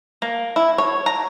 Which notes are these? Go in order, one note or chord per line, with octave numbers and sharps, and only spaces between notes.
A#3
E4
C#5
A#5